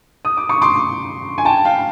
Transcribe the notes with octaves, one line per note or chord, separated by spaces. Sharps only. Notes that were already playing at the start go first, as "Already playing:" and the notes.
D#6
D6
C#6
C6 D6
G#5
G5 A5
F5 G5